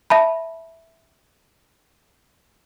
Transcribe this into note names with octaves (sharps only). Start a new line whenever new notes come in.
E5 A5 B5